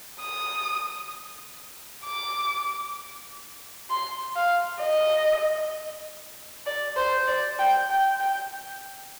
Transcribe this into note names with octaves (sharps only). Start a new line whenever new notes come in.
D#6
D6
C6
F5
D#5
D5
C5
D5
G5
G5
G5